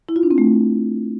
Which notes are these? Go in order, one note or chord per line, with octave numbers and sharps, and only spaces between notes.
E4
F4
D4
C4
A3